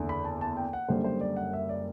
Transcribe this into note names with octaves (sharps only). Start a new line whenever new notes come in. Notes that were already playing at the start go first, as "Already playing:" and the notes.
Already playing: F#1 E2 D3
B5
A5
A5
G5
F#5
F#1 F#2 D3 G3 C5
C5
D5
F#5
E5
D5